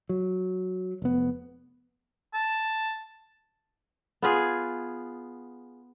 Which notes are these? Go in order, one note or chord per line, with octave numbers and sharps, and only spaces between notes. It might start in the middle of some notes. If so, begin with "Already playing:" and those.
F#3
F1 B3
A5
B3 F4 G#4